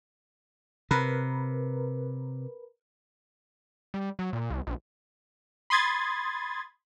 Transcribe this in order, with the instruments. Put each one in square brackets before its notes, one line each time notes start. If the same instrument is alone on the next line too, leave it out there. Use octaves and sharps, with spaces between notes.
[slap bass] C3 [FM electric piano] A#4 B4
[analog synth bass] G3
F#3
A#2
C2
A#1
[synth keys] B5 C6 D#6 G#6 A6